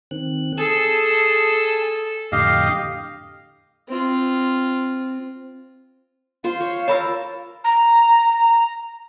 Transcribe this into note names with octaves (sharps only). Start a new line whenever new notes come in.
D#3 C4 F#6
G#4 A4 G#5 A5 E6
F2 A2 D3 G4 D#5 F5
C4 F4
F4 C5 F5
C#5
A#4 C#5 A5 B5 E6
A#5